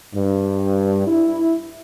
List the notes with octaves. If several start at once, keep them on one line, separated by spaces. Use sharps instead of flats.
G2
E4